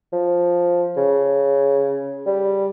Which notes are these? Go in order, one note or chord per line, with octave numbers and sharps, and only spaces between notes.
F3
C#3
G3